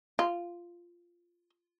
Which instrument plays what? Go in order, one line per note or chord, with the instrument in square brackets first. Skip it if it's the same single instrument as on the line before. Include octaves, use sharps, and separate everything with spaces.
[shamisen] F4